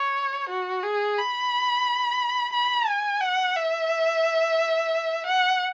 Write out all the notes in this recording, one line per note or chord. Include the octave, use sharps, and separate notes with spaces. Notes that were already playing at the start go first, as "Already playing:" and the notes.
Already playing: C#5
F#4
G#4
B5
B5
G#5
F#5
E5
F#5